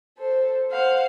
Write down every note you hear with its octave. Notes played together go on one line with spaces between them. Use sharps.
A4 C5
C5 F5 F#5